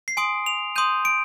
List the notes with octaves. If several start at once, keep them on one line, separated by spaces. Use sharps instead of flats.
C7
G#5 C6 D#6 D7
F7
C6 D#6 G6 D#7
D7